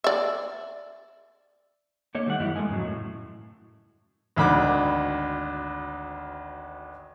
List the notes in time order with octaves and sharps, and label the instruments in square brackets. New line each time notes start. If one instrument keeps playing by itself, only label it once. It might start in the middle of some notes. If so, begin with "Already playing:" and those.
[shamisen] D5 E5
[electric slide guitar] A3 A#3 C#5 D#5
D#3 G3 A3 D4 F#5
F#2 E3 G3 E4
G#3 A4 A#4 D#5 G#5
F2 G#2 C#3 F#3
A2
[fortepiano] G#1 D2 B5 D6